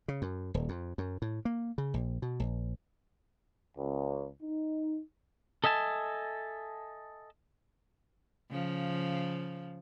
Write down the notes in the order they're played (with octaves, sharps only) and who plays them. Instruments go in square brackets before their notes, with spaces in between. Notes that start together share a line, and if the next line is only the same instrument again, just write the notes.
[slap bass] C#3
F#2
D#1
F2
F#2
A2
A#3
C#3
A#1
B2
A#1
[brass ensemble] C#2
D#4
[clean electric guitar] A4 D#5 E5 G#5 A5
[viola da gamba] C#3 F3